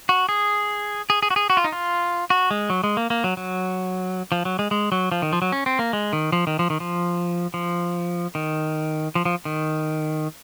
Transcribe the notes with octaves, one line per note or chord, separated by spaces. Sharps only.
F#4
G#4
G#4
G#4
F#4
G#4
F#4
F4
D#4
F4
F#4
G#3
F#3
G#3
A#3
A#3
F#3
F#3
F3
F#3
G#3
G#3
F#3
F3
D#3
F3
F#3
C#4
C4
A#3
G#3
D#3
F3
D#3
F3
D#3
F3
F3
D#3
F3
F3
D#3